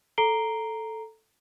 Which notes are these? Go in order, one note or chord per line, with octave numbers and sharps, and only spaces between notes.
A4 A#5 C7 D7 G7